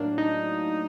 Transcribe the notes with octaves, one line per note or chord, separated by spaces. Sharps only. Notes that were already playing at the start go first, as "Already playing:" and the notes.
Already playing: A2 F#3 A#3 D4
D#4